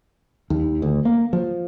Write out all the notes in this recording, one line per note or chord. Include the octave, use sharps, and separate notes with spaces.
D#2
D2
A#3
F3